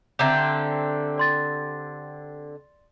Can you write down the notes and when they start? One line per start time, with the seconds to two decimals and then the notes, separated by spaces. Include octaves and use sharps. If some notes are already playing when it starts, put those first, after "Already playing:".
0.19 D3 C4 G4 E5 A#5 G6
1.18 D5 C6 A6